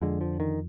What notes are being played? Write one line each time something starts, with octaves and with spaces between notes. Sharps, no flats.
F2 D3 G#3
F3
D#3